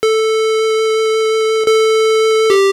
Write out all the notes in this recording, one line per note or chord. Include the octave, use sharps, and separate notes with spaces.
A4
A4
G4